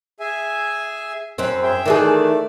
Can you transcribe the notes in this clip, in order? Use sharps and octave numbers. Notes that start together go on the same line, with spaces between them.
G#4 E5 G#5
F#2 C4
G#4 E5 G5
D#3 E3 A3 G#4 D5